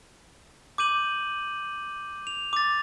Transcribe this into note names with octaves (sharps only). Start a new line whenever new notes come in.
D6 G6 D#7 F#7
F7
D6 A6